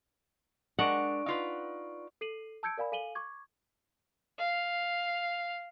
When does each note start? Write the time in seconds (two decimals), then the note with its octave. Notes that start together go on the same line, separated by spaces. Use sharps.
0.79 G#3 D4 A#4 D5 F#5 C#6 D7
1.26 D#4 F4 B4
2.21 A4 C7 D#7 F#7
2.63 A5 E6 G6 G#6 C#7 D7
2.78 A#4 D5 F5 G#5 B5
2.92 A4 F5 G#5 D#7 F#7 G7
3.15 C#6 D6 G#6
4.38 F5